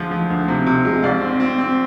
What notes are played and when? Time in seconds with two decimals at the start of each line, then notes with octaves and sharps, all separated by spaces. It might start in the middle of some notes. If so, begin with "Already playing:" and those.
Already playing: D2 F3 G#3
0.11 F3
0.30 D2
0.48 C3
0.66 C3
0.85 G#3
1.03 C2 D5 F5
1.21 C4
1.40 C4
1.58 C4